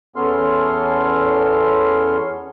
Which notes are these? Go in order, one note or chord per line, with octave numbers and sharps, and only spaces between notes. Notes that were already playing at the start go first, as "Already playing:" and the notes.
E2 B3 C#4 A4 C6 F6